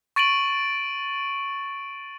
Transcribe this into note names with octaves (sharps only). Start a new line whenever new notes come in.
C#6 A6 D7 D#7 F#7